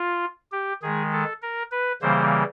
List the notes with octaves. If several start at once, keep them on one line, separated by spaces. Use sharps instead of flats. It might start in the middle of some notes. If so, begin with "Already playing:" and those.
Already playing: F4
G4
D#3 G#3 G#4
A4
A#4
B4
C#3 E3 G3 A#3 C5